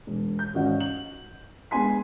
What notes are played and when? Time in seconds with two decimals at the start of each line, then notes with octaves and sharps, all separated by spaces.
0.07 E1
0.39 G6
0.54 G#1 C#4 F#4 D#5 F#5
0.80 F#7
1.71 G#3 B3 D4 G#5 C6 B6